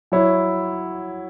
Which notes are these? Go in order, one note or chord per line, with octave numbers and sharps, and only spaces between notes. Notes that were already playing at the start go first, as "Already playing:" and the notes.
F#3 E4 C#5